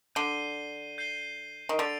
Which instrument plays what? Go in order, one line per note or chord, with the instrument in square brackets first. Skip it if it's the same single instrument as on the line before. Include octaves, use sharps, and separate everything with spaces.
[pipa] D3 [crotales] G6 C7 D#7 G7
[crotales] G6 C7 D#7 G7
[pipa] D#3
[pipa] D3 [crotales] E6 A6 D7 F7